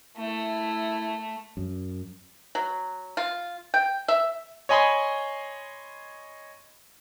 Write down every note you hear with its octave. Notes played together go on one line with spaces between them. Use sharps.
A3 E4
F#2
F#3
F4
G5
E5
C#5 D#5 G#5 B5 C6 D#6